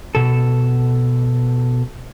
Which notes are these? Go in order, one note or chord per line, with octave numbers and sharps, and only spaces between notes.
B2 A4